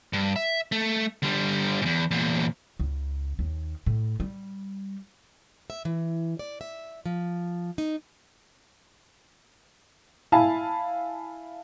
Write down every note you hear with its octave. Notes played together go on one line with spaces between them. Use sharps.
G2
E5
A3
D3 G3
E2 G#2
E2 A#2
C#2
D#2
A2
G3
E5
E3
D5
E5
F3
D#4
E4 F5 G#5 A5 B5